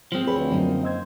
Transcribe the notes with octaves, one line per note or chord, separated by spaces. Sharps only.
F3 G#3 B3 C4
D2 G#4 B4 C#5 B5
F#2 D3 A#3 D#4
C5 D#5 E6 G#6